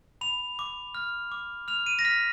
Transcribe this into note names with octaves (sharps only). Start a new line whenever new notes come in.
B5 F7
D6
F6
D6
F6 F7
D#7
A#6
F6 B6